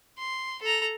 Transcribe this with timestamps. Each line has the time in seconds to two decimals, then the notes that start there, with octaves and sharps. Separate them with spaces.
0.18 C6
0.62 A4 A#5